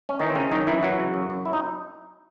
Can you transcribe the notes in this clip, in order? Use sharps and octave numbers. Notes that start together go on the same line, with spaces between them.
C#4
D#3 E3 D#4
C4
C#3 C#4
F#2 D#3 D#4
F#2 E3 E4
E3 F#3 F#4
C#3
F#2
F#2
E4
D#4